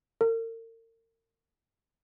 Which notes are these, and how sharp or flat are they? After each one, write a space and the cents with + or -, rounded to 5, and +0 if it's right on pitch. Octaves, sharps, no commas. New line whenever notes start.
A#4 -40